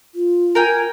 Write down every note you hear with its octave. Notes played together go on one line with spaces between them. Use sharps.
F4
A#4 G5 G#5